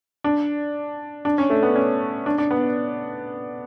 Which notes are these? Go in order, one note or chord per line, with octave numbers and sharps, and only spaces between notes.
D4
D4
C#4
A3
B3
C#4
D4
D4
B3